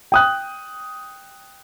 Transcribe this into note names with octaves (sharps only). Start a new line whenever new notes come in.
G5 D#6 F#6